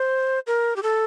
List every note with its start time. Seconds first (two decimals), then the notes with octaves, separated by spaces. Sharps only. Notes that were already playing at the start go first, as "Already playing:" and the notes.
Already playing: C5
0.47 A#4
0.76 G4
0.83 A4